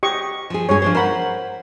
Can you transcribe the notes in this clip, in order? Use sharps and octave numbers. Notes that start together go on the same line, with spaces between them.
G4 D#5 C#6
F3 G#4
G2 G#3 G#4 C#5
F3 D4 C5
A#4 C5 F#5 B5